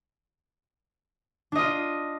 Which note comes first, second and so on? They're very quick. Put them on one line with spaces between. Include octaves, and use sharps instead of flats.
D4 D#5 F4